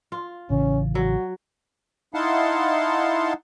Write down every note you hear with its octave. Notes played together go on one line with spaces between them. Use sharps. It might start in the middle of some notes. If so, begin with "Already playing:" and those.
F4
A1 C#3 E3 C#4
F#3 F#4
D#4 E4 F5 F#5 A5 C6